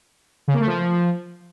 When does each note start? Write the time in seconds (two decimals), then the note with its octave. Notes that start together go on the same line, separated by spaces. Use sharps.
0.48 C#3
0.54 A#3
0.60 A3
0.67 F3